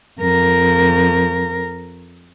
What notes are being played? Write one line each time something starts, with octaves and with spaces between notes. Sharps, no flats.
F2 A#4